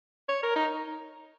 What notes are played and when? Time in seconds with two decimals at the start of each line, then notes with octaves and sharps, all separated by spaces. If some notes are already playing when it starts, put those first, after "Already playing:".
0.29 C#5
0.43 A#4
0.56 D#4